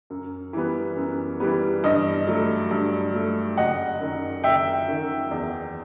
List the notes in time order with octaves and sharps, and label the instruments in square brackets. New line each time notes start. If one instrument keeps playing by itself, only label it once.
[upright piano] F#2
E3 G3 B3
F#2
E3 G3 B3
G2 D#5
F#3 A3
G2
F#3 A3
F#1 D#5 F#5
F#2 D#3
F#1 E5 G5
F#2 D#3
E2